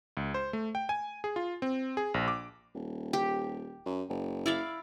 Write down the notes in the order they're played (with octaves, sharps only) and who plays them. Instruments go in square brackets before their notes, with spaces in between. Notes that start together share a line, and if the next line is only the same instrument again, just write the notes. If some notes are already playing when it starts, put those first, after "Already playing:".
[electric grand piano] C#2
C5
A3
G5
G#5
G#4
F4
C4
G#4
A#1
D6
[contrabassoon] D#1
[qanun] G4
[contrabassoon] F#2
F#1
[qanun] E4 D5 F5